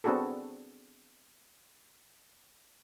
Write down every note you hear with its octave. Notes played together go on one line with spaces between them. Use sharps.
B3 C4 D4 F#4 G#4 A4